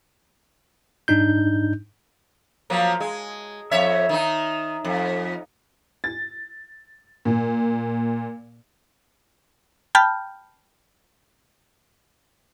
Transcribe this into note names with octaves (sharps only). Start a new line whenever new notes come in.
G#2 D4 D#4 G6
F3 F#3 A#3
G#3
F2 C#5 E5
D#3 D#4
F2
A6
A#2
G5 A5 B5 F6 G6